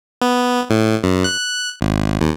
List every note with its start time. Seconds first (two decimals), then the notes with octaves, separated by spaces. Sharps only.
0.22 B3
0.70 A2
1.04 F#2
1.24 F#6
1.81 G#1
2.21 D#2